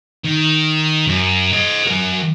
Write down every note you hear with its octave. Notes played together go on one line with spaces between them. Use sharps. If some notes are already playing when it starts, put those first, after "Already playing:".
D#3
F#2
C5 D#5
F#3 A#4